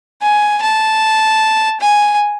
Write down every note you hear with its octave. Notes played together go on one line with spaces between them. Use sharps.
G#5
A5
G#5